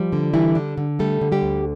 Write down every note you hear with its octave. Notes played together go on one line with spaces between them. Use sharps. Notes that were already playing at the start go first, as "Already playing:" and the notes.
Already playing: F3 G3 F4
D3
E3 G3 E4
D3 D4
D3
G3 A3 A4
D3
G3 G4
D2